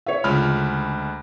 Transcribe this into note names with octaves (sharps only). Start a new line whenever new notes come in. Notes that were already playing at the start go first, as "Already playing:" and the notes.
C#5 E5
D2 C#3 G#3 F4 B5 F6